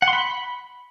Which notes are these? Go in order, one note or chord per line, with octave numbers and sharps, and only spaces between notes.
F#5
C6
B5